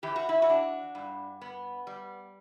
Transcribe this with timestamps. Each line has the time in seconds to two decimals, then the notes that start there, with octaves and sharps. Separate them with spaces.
0.03 E3 G4
0.16 F#4
0.29 E4
0.42 F#4
0.50 D4
0.95 G2
1.41 B3
1.87 G3